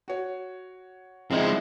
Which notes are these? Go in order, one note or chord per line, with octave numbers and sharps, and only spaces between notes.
F#4 C#5
F3 G#3 C4 D#4 E4